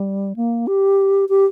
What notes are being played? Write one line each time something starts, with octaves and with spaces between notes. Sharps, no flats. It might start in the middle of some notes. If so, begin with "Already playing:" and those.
Already playing: G3
A#3
G4
G4